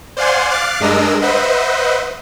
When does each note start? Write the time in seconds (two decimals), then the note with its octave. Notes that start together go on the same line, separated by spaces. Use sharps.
0.17 C5 D5 F5 F#5 G#5 C6
0.50 F5 D6 F6 F#6 A6 C7
0.80 G2 G#3 D4 A#4 D#5 E6
1.22 B4 C5 D#5 E5 F#5